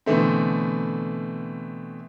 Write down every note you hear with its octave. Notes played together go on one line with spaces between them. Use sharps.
B2 D3 E3 A3 C4